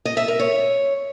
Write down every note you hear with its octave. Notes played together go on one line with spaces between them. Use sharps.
D#5
E5
A#4
C#5